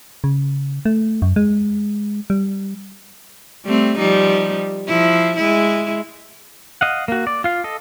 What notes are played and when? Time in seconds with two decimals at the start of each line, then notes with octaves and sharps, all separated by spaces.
0.24 C#3
0.85 A3
1.22 F#2
1.36 G#3
2.30 G3
3.65 G3 A3 C4
3.98 F3 G3 D#4
4.88 F3 E4
5.37 G#3 E4
6.81 D#5 F5 F#5
7.08 A#3 F#4
7.27 D5
7.44 F4 F5
7.64 A4 D#5